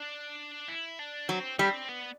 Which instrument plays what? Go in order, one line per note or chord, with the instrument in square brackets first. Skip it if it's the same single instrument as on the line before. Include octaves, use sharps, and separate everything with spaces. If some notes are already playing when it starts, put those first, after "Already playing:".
Already playing: [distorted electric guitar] D4
E4
D4
[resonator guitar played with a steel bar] F#3 [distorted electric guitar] C4
[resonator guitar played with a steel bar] G3 [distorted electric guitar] C4
[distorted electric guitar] B3